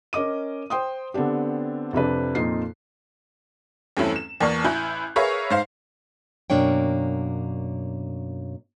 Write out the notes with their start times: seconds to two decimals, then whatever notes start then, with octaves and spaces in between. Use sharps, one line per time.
0.13 C#4 A#4 D#5 D6 D#7
0.70 C5 G5 C6 D#6
1.14 D3 B3 C4 D4 G4
1.93 F2 C3 D4 B4
2.35 F2 A#2 D#4 F4 C7
3.97 E2 G2 A3 C4 C#4 E4
4.16 E7
4.41 E2 A#3 D5 A5 C#6 F6
4.64 A1 E4 G#5 B5 F#6 G6
5.16 G#4 A#4 B4 C#5 E5 F5
5.50 G#2 C5 F5
6.50 F#2 B2 A#3 D4 C#5 G5